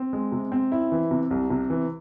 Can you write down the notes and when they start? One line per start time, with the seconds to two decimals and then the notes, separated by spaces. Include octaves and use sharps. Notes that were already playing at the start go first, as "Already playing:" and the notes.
Already playing: C4
0.13 G#3
0.32 C3
0.52 C4
0.72 E4
0.92 E3
1.11 C3
1.31 C2
1.50 C3
1.70 E3